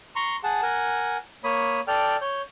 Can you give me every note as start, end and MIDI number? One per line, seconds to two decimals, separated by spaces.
0.16 0.36 82
0.16 0.36 84
0.16 0.36 85
0.44 0.61 68
0.44 0.61 78
0.44 0.61 81
0.62 1.17 70
0.62 1.17 78
0.62 1.17 80
1.44 1.80 58
1.44 1.80 73
1.44 1.80 83
1.44 1.80 87
1.88 2.16 69
1.88 2.16 74
1.88 2.16 79
1.88 2.16 89
2.21 2.42 73
2.21 2.42 91